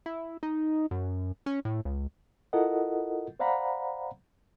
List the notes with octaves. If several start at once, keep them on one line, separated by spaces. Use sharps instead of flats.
E4
D#4
F#2
C#4
A2
C#2
E4 F4 A4 A#4 D#5 F#5
C5 D5 F5 F#5 A#5 B5